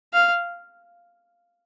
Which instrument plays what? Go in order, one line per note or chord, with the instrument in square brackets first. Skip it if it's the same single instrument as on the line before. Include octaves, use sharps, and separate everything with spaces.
[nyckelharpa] F5